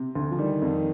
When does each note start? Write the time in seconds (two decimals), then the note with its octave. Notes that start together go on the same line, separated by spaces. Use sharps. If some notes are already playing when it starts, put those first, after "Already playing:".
Already playing: C3
0.15 D2
0.31 F3
0.39 D#3 G3
0.62 F2